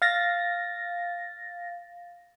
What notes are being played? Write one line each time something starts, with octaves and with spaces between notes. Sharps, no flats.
F5 A6 A#6